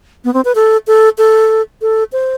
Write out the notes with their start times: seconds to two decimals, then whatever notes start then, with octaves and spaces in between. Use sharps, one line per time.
0.24 B3
0.34 C4
0.45 B4
0.55 A4
0.87 A4
1.18 A4
1.82 A4
2.12 C5